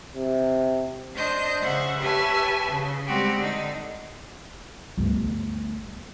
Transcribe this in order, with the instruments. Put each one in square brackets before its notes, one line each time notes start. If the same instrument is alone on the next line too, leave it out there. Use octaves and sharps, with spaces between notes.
[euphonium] C3
[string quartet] D4 C5 D#5 G6
C#3 C5 E5 F#5
G4 B4 C#5 E5 G#5 A5
C#3
G3 G#3 C4 F#4 G4
D3 D#4
[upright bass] G1 D2